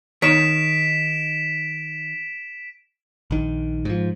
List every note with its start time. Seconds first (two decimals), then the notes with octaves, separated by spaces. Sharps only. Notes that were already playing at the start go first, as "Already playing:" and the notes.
0.22 D#3 C#5 B6 D7 E7
3.31 A#1 D#3
3.85 G#2 F3